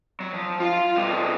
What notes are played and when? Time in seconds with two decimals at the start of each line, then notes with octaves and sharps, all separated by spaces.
0.20 F#3
0.34 F3
0.60 F4 F5
0.96 B2 G3